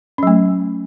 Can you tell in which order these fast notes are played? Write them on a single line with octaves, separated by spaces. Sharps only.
C#4 F#3 A3